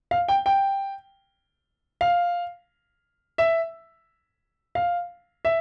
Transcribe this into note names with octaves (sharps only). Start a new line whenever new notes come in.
F5
G5
G5
F5
E5
F5
E5